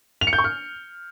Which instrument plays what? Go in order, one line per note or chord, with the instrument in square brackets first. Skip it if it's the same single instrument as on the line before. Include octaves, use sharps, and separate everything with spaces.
[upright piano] F7
C#7
G6
C#6
F6